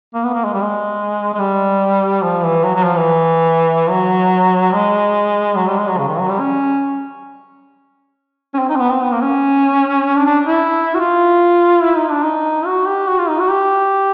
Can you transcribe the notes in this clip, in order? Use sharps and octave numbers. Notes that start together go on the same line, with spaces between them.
A#3
B3
A#3
G#3
G3
G#3
G#3
G3
F3
E3
F#3
F#3
F3
E3
F#3
G#3
F#3
G3
G#3
F#3
C#3
D#3
F#3
G3
C#4
C#4
C4
D#4
C4
B3
C4
B3
A#3
C#4
D4
D4
E4
F#4
F4
E4
D#4
D4
D#4
F#4
G4
F#4
F4
D#4
F#4
G4